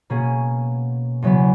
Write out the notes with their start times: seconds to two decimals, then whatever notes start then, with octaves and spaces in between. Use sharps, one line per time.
0.10 B2 A#3 C#4 G#4
1.22 E2 C#3 F#3 B3